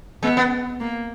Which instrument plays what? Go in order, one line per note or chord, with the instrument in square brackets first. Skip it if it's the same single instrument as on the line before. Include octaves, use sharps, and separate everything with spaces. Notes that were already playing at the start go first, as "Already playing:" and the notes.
[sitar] G#3 [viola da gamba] B3
[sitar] B3
[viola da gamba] A#3